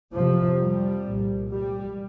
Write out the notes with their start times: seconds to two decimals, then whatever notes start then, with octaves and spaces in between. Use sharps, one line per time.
0.13 F2 C3 F3
0.58 G3
1.05 C2 A#2
1.51 G3